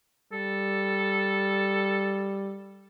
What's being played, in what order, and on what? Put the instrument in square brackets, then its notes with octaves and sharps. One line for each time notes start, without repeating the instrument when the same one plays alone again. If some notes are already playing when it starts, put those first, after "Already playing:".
[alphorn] G3 [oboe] A4